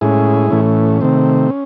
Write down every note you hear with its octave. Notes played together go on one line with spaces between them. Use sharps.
A2 G#3 C#4 E4 G#4
A2 E3 A3 C#4
C3 D#3 A3 C4
C#4